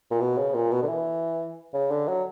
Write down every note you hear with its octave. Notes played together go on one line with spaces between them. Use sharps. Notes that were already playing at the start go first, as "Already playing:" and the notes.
A#2
B2
C#3
A#2
B2
D3
E3
C#3
D3
F#3